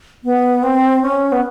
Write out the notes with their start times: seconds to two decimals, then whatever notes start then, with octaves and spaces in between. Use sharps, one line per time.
0.24 B3
0.63 C4
1.02 C#4
1.32 B3